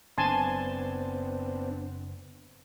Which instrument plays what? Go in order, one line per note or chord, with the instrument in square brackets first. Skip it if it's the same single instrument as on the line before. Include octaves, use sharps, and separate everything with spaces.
[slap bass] F#1 [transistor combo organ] B3 C4 D4 [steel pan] G#5 A5 C6